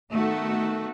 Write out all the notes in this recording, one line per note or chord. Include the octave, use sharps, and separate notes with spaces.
D#3 A3 B3 D#4 F#4 A4